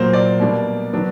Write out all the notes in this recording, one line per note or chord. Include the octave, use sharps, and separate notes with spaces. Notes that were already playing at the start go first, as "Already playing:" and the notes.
Already playing: A#2 F#3 A#3 C5
D5
B2 G3 A#3 D4
D#3 F#3 B3 D4